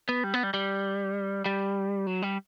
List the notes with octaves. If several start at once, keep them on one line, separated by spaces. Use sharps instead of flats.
B3
G3
B3
G3
G3
G3
F#3
G3